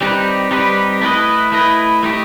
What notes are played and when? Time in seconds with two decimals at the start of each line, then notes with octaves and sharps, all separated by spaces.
0.01 G3 C4 D#4 G4 B4
0.51 G3 C4 D#4 G4 B4
1.02 A3 E4 B4 D#5
1.52 A3 E4 B4 D#5
2.03 A3 D#4 G4